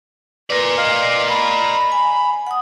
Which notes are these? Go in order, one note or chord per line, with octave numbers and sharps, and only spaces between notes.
A#4 B4 D5
D#5 F5
B5
G#5
F#5 D#6